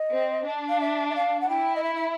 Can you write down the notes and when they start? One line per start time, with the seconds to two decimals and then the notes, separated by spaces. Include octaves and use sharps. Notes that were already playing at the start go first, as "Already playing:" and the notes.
Already playing: D#5
0.11 C4
0.46 D4
0.69 F5
0.81 E5
1.10 E5
1.16 F5
1.41 F#5
1.49 E4 G5
1.76 D#5
1.84 E5
1.96 E5